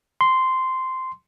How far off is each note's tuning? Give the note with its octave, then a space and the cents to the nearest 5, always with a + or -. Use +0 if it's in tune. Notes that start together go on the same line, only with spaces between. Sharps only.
C6 -10